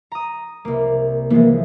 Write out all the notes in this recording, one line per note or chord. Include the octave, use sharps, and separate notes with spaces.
A#5 D#6
C2 A#3
E3 F3 G#3 A#3